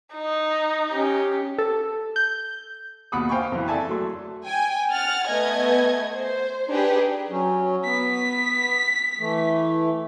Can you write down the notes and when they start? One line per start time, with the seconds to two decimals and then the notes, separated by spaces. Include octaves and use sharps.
0.14 D#4
0.90 C#4 G4
1.59 A4
2.16 G6
3.12 D#2 B2 F#5 B5 D6 D#6
3.29 C5 F5 G5 G#5 B5 C#6
3.52 F2 E3
3.68 A4 D5 E5 G#5 A5
3.89 F#3 A3 C6
4.44 G5 G#5
4.91 F#5 F6 A6
5.27 A3 B3 D#5 G#5 G#6
6.13 C5
6.68 D4 D#4 G4 G#4 B4
7.30 F#3 C#4
7.84 B3 B6
9.19 E3 A3